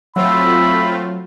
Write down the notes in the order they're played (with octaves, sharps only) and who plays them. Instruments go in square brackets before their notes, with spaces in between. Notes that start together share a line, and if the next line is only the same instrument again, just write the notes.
[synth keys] F#3 [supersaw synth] A3 C4 F4 [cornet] B5 [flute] E6